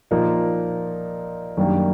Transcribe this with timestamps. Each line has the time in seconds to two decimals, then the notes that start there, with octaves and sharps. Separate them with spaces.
0.11 A#2 F3 A#3 D#4
1.57 F#2 D#3 G3 A#3 D4